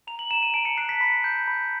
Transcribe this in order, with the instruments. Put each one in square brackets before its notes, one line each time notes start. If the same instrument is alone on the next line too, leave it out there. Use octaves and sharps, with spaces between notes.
[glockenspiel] A#5 F7
F#7
A#5 E7
D#7
A5 D7
C#7
F#6 C7
B6
B5
G6
B5